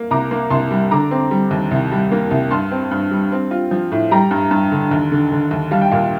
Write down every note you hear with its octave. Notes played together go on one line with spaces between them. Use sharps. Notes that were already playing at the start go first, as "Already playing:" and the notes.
Already playing: A#3
C2 A#5 D6
A#3
C2 A5 C6
G3
D3 A#5 D6
C4
G3
D#2
C2
G3
A#3
C2
G2 A5 C6
C4
G2
G3
C4
F4
F3
A2
G3 G5 A#5
G2
G2
D3
D#2
D3
D3
D#2
G3 F5 A5
G5
A#2 F5 A5